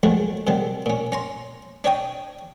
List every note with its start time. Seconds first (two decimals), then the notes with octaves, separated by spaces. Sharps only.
0.03 D#2 F3 F#3 G#3 A3
0.47 C3 D#3 F#3 G3
0.86 A#2 C#4
1.12 C#4 A#5 C6
1.84 D4 C#5 D#5 G5 D#6